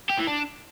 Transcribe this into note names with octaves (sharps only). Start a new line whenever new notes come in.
G4
E3
D4